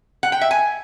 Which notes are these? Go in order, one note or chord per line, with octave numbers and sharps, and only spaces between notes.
F#5
G5
E5
G#5